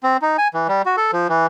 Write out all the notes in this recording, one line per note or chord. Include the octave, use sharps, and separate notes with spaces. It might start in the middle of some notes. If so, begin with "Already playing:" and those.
C4
D#4
G#5
E3
G3
F#4
A4
F3
E3